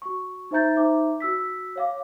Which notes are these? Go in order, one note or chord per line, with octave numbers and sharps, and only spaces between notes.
F#4 C#6
D#4 C5 E5 A#5 G6 A6
D#4 C5 E5 A#5 D6
F#4 E6 B6
C#5 F5 D6